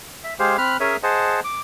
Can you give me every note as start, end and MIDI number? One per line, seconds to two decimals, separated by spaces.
0.24 0.34 76
0.39 0.57 56
0.39 0.57 67
0.39 0.57 68
0.39 0.57 72
0.39 0.57 77
0.58 0.77 60
0.58 0.77 83
0.58 0.77 89
0.58 0.77 90
0.80 0.97 61
0.80 0.97 68
0.80 0.97 70
0.80 0.97 73
0.80 0.97 76
0.80 0.97 87
1.03 1.40 68
1.03 1.40 72
1.03 1.40 75
1.03 1.40 78
1.03 1.40 81
1.44 1.61 86